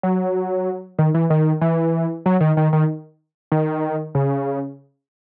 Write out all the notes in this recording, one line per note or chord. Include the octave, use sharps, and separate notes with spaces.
F#3
D#3
E3
D#3
E3
F#3
D#3
D#3
D#3
D#3
C#3